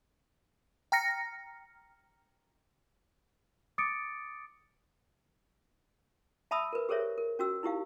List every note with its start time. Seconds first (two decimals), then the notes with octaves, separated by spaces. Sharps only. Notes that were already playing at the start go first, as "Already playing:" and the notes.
0.92 G5 A#5 F6 A#6 C#7
3.78 D6 D#6 A6 C#7 D7
6.51 E5 A5 B5 D#6 E6
6.73 A#4 B4
6.89 G4 G#4 A#4 C5 C#5 E5
7.18 A#4
7.39 C#4 F#4 E6
7.63 D#4 E4 G4 F5